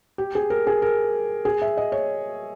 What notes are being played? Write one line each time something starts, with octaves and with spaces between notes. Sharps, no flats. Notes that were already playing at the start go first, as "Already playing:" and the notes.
G4
G#4
A#4
G#4
A#4
G#4
E5
D#5
C#5